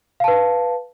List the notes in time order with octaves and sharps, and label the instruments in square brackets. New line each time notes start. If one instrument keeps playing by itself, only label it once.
[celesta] F5
A5
B4